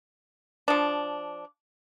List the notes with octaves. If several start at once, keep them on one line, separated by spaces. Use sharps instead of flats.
F3 D4